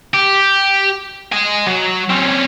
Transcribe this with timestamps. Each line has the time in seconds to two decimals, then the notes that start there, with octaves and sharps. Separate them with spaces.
0.14 G4
1.32 D#5 G#5
1.66 F#3
2.10 C4 C#4